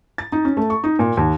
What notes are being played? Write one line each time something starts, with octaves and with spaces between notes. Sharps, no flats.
A6
D#4
C#4
A3
C#6
D#4
A#2
D#2